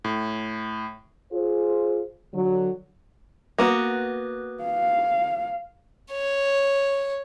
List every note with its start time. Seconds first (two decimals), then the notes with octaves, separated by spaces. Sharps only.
0.04 A2
1.32 F4 G#4 C5
2.33 D3 F#3
3.58 A#3 B3 F#4
4.64 F5
6.12 C#5